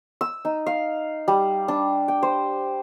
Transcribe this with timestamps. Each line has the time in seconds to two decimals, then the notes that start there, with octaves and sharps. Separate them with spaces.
0.21 E6
0.45 D#4
0.66 F5
1.28 G3
1.68 D4
2.08 G5
2.23 C5